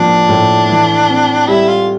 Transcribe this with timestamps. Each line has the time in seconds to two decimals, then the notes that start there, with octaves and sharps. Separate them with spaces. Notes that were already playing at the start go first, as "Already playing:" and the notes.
Already playing: A2 F3 A#3 D4
0.29 A2
0.69 E3
1.08 C4
1.48 G3 E4
1.68 F4